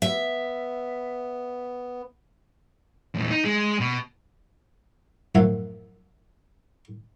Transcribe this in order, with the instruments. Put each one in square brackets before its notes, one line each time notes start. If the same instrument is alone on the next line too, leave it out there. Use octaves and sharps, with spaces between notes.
[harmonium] B3 [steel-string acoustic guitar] E5
[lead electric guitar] E2 A#2
D#4
G#3
B2
[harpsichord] F#2 A2 F3 E5 F#5 G#5